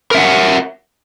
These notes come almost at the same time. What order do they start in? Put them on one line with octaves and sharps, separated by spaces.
A#4 E5 F#5